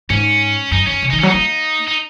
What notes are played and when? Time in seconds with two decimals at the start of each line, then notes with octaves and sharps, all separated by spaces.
0.10 G#2 C#4
0.71 F#2 D#4
0.87 F#2 C#4
1.02 C3
1.10 D#3 D#4
1.19 C#4
1.23 F#3
1.28 D#4
1.34 A#3
1.87 D#4